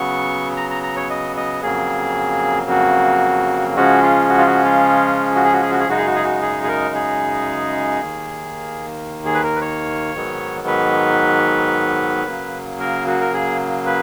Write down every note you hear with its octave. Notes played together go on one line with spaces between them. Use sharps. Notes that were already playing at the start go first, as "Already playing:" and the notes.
Already playing: C#3 F#3 B3 C#6
A#5
A#5
A#5
C#5
D#5
D#5
F2 C#3 F#3 A#3 G#4
F#4
C#3 F3 G#3 C#4 F#4
F4
F#4
F4
F#4
F4
F#4
G#4
F#4
G#4
F#4
G#4
F#2 C#3 G#3 D#4 F#4
G#4
F#4
G#4
F#4
G#4
G#4
A#4
G#4
D#2 D#3 A#3
G#4
B4
A#4
B4
C#5
G#2 D#3 F#3 B3
B4
C#3 F#3 A#3
A#4
F#4
A#4
G#4
B4